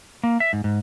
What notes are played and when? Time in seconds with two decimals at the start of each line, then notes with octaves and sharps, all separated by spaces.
0.23 A#3
0.40 E5
0.53 G#2
0.64 G#2